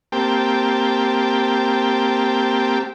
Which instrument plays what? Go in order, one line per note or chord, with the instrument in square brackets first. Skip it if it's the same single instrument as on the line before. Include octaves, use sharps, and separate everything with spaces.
[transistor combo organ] A#3 C4 G4 G5 A5